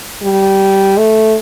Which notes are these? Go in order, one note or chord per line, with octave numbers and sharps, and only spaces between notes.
G3
A3